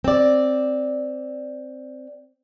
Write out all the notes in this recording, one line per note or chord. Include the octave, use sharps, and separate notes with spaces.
C4 D5